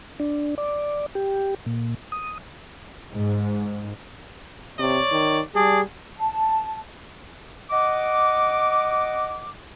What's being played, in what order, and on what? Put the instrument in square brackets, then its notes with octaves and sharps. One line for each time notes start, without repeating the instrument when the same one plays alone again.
[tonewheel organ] D4
D5
G4
A#2
D#6
[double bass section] G#2
[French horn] C3 [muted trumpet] C#5 [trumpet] D5
[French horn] D#3
[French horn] G3 [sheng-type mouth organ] G#4 [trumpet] D5 [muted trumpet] A5
[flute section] A5
[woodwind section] D#5 F#5 D6